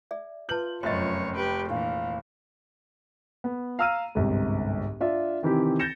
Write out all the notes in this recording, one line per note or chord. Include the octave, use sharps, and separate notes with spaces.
G#4 D5 E5
F4 G#4 B4 A5 G6 F#7
F1 F#2 C#5 D#5 E5 C6 A6
G4 B4 G5
A#2 E3 D4 G4 F5
B3
F5 A#5 E6 F6 D#7
G1 C2 G#2
D4 F4 E5
C3 D#3 E3 C4 E4 G4
G6 A6 A#6 C#7 E7